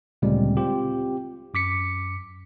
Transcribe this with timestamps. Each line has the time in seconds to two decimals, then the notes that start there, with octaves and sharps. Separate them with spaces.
0.22 D2 A#2 C#3 G3 G#3 C4
0.57 C4 F4 G4
1.54 F#2 D6 B6 C#7